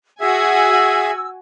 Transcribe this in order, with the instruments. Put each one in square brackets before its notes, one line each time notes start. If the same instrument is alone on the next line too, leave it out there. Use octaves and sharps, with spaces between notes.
[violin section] F#4 G#5 [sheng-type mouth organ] G#4 E5 [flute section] E6